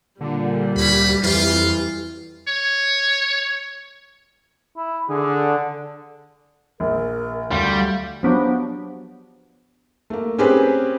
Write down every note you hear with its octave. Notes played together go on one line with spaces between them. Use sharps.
A#2 D3 G3
D2 A3 C#4 B5
F2 E3 F4
C#5
E4
D3 G#4
A#1 A#4
D2 G3 F5
F3 F#3 B3 D4 F#4 G4
A3 A#3
C4 C#4 G4 G#4 A#4 B4